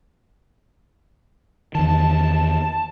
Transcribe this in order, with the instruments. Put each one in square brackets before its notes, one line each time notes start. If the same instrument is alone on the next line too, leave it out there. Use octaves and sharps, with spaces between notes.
[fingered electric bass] E2 D#3 [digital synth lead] A5